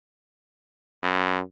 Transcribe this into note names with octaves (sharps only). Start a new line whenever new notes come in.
F#2